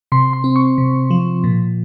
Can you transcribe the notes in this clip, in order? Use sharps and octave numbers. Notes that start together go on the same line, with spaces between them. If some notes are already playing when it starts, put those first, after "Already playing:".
C3 C6
C6
C4
C#6
C3
F3
A#2